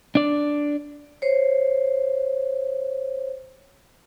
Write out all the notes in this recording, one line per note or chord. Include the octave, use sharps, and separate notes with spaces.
D4 D5
C5 C#5